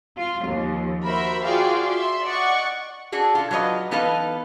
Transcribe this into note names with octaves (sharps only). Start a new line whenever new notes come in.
F4
D#2 F3
F#4 A#4 C5 E5 B5
F4 F#4 G#4 D5 F5 G5
E5 C6
D5 D#5 F#5 C#6
D4 F#4 G#4 A4
F4 A4
F#3 F4 B4 C#5 D#5
E3 B3 D#4 A4 B4 F5